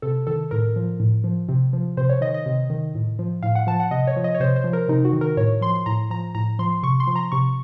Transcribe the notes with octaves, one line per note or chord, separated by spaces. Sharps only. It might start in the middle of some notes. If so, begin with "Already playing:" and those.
C3 A4
D#3 A4
A2 A#4
F3
A2
F3
C3
F3
C3 C5
C#5
D#3 D#5
D#5
C3
D#3
A2
F3
A2 F5
F#5
F3 A5
F#5
C3 D#5
C#5
F3
D#5
C#5
C3 C5
C5
F3
A#4
C3 D#4
F#4
D#3
A#4
A2 C#5
F3 C6
A2 A#5
F3 A#5
A2 A#5
F3 C6
C3 C#6
C6
F3
A#5
C3 C#6